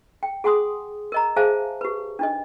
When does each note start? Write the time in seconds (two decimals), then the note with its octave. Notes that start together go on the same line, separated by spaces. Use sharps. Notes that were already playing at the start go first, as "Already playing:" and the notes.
0.23 G5
0.44 G#4 F#5 G#5 C6 D#6
1.12 A#4 D#5 A#5
1.36 G#4 C5 E5 F5 G#5 A5
1.81 G4 B4
2.19 D4 D#4 D#5